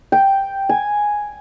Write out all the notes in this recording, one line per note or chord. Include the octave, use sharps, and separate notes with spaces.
G5
G#5